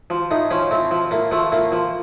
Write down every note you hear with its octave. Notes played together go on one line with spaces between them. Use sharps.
F3
A2 D#4
F3 C#4
A2 C4
F3
A2 A#3
F3 A3
A2 A#3
F3